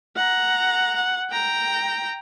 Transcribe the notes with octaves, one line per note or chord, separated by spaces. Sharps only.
F#5 A#5
F#5
G5 A#5